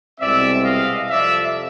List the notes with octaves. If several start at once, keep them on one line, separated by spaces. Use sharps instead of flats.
C2 B2 G#3 C4 D5 E5
D#5 F5
F2 C3 F3 D5 E5